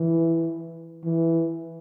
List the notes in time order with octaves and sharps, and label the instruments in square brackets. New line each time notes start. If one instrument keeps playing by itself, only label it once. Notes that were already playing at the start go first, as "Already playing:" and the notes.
Already playing: [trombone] E3
E3